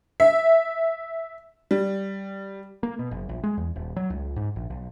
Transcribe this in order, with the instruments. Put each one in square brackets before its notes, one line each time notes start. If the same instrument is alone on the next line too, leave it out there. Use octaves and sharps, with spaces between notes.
[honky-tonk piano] E5
G3
[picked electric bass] A#3
B2
F#1
A#1
G#3
E2
D#1
F#3
C#2
G#2
A#1
B1